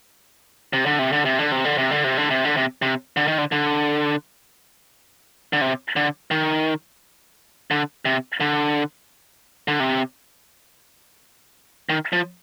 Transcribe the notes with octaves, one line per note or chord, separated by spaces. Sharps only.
C3
D3
C3
D3
C3
D3
C3
D3
C3
D3
C3
D3
C3
D3
C3
C3
D3
D#3
D3
D3
D3
C3
D3
D#3
D3
C3
D3
D3
C3
D#3
F3